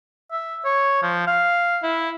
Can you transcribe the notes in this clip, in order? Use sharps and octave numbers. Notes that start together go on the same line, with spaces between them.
E5
C#5
F3
F5
E4